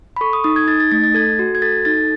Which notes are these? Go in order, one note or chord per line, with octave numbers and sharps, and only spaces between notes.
B5
A4 C#6
D#6
D#4 D#6
G#6
D#4 A6
A6
A3 A6
A6
A4 G#6
F#4
G#6
A4 A6
D#4 A6